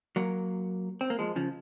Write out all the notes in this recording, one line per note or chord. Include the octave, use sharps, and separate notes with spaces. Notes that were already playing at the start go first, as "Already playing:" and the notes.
F#3 A#3
C4
A#3
F3 G#3
C#3 F3